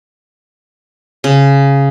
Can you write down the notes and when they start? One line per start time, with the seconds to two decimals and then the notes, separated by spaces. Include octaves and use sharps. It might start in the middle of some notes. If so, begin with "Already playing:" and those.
1.24 C#3